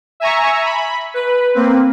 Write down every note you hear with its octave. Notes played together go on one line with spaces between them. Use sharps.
E5 G#5 A#5 C#6
B5
B4
A#3 C4